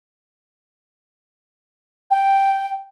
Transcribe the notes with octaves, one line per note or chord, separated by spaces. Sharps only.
G5